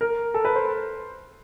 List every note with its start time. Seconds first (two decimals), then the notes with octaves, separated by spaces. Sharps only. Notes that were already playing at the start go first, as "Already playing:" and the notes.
0.01 A#4
0.34 A4
0.45 B4
0.56 C5